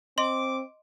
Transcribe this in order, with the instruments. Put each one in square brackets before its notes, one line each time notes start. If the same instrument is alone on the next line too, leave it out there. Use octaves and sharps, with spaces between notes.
[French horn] C4 [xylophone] D#5 C6 F#7 [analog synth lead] D6